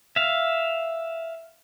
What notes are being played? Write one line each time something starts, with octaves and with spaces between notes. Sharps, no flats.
E5 F5